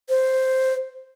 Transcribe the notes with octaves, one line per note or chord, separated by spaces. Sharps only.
C5